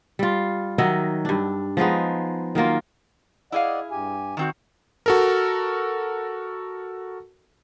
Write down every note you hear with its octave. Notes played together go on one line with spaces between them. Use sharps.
G3 F4
D#3 F#3 D#5 E5
G2 D4
F3 G#3 B3 D#4
D#3 F#3 A#3 F4
E4 G#4 D5 D#5 F5 F#5
G2 G4 G#5
D#3 C4 F#4
F#4 A4 A#4